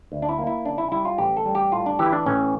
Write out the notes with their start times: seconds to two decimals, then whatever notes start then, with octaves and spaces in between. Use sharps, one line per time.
0.12 D2
0.22 D4
0.29 E4
0.39 A#3
0.47 E4
0.65 C#3 D4
0.78 E4
0.92 G3 E4
1.05 F4
1.18 A1 G4
1.37 A4
1.46 G3
1.55 G4
1.72 A2 F4
1.86 D4
1.99 E3 G4
2.06 E4
2.12 D4
2.26 A1 C#4